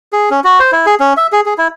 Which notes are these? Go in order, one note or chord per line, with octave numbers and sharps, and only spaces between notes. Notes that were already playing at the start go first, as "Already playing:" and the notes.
G#4
C#4
F#4
C5
E4
G#4
C#4
E5
G#4
G#4
E4